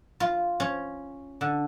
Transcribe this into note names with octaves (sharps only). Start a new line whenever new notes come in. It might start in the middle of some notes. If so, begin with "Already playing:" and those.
F4
C#4
D3